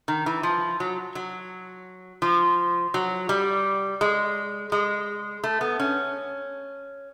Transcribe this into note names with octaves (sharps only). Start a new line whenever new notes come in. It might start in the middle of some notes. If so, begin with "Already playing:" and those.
D#3
E3
F3
F#3
F#3
F3
F#3
G3
G#3
G#3
A3
B3
C#4